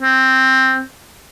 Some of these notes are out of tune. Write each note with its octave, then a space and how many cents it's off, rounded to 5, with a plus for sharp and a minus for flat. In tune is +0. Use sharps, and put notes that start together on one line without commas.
C4 +5